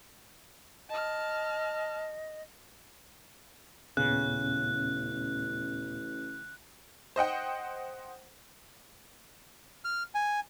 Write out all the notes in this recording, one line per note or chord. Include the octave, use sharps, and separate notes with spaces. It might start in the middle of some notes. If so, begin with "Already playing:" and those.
D#5 A5 F6
A1 D#2 A#2 C#3 B3 F#6
C5 D#5 F#5 G5
F6
G#5